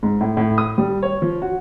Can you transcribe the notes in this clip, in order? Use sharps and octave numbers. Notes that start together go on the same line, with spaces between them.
G#2
A2
A2
D#6
G3
C#5
F3
F#4